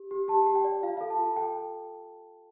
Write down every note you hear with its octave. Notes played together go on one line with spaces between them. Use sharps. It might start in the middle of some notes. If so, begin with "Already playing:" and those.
Already playing: G4
G4
G4 A5
G4
G5
D5
F4 F5
A4 F5
A5
F4
A4 G5